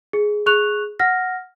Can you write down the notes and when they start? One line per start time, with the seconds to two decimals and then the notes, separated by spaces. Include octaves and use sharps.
0.13 G#4
0.46 G#4 C#6 F#6 F7
0.99 F#5 F6 A#6